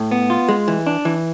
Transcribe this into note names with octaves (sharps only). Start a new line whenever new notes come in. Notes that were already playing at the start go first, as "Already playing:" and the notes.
Already playing: A2
B3
F4
G#3
E3
D4
E3